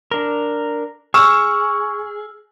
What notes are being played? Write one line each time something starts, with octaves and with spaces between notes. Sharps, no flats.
D4 A#4
G#4 C#6 E6 F6 E7